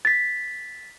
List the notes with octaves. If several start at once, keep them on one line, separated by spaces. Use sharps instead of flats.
A6 B6